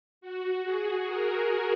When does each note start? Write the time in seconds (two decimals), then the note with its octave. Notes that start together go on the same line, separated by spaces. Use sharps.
0.21 F#4
0.65 G#4
1.08 A#4